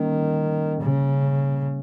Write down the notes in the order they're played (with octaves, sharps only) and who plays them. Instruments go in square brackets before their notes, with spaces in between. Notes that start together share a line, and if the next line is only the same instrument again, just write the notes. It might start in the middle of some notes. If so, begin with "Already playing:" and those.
Already playing: [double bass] D#3 [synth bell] G3 A#3 C#4
[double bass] C#3